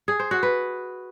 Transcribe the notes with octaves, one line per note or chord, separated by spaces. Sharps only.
G#4
C5
F#4
B4